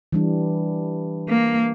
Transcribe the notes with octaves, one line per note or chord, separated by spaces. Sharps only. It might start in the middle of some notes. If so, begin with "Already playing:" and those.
E3 G3 D4
A#3